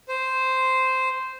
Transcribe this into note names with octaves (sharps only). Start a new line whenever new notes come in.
C5